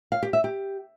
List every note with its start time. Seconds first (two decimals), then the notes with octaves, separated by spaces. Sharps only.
0.12 F5
0.23 G4
0.33 E5
0.44 G4